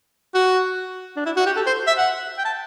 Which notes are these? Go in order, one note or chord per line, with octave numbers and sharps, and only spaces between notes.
F#4
D4
E4
F#4
G4
A4
C5
E5
F#5
G5
A5